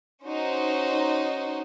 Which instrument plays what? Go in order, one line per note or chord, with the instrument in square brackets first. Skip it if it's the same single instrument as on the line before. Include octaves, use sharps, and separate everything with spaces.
[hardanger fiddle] C#4 F#4 [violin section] D#4 C5